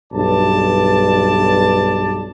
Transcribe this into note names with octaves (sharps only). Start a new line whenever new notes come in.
B1 G2 D5 A5